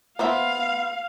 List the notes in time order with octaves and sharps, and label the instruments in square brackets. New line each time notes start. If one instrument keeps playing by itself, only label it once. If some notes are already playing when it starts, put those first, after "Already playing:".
[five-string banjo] B3 C5 E5 [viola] F5